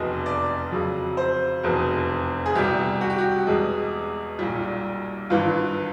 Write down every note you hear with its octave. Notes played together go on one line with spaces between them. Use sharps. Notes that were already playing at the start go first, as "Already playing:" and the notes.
Already playing: F1 E2 B2 D#5
D5
F2 C#3 F#3
C5
F1 E2 B2
G#4
C2 B2 G3 G4
F#4
G4
F#4
E2 B2 G#3
B1 A#2 G3
G#1 G2 E3 F4